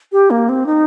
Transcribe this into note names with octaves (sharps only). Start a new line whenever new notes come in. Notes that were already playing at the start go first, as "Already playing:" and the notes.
G4
A#3
C4
D#4